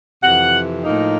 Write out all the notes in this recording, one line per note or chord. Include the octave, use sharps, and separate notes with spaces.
F2 C3 E3 F#5
A2 F3 A#3 D#4